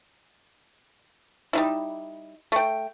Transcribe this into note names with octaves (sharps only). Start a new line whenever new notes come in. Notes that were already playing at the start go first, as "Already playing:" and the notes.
G3 D#4 E4
A3 G5